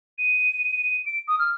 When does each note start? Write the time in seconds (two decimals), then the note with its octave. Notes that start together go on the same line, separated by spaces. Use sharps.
0.18 D#7
1.06 D7
1.28 D#6
1.39 F6